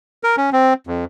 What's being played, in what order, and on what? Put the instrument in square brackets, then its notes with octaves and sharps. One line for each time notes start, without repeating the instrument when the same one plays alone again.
[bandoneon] A#4
C#4
C4
F2